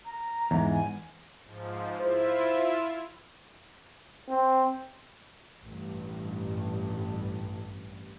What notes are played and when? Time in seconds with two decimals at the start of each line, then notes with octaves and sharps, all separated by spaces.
0.06 A#5
0.51 E2 G#2
0.72 G#5
1.45 G#2 F3
1.99 E4 F4 C5 E5
4.29 C4
5.62 A1 G2